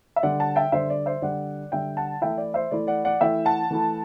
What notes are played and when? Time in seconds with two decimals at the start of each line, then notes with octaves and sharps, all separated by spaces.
0.16 E5
0.23 D3 G3 D4 D5 F#5
0.40 F#5 A5
0.56 E5 G5
0.72 D3 G3 D4 C5 E5
0.90 D5
1.06 C5 E5
1.22 D3 G3 D4 D5 F#5
1.72 D3 G3 D4 E5 G5
1.97 F#5 A5
2.22 E3 A3 E4 E5 G5
2.38 D5
2.54 C5 E5
2.71 E3 A3 E4 D5
2.87 D5 F#5
3.05 D5 F#5
3.21 E3 A3 E4 E5 G5
3.45 F#5 A5
3.71 E3 A3 E4